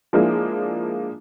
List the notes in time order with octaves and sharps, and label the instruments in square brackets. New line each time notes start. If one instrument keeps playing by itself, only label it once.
[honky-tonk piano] F3 G#3 A#3 D4 E4 G#4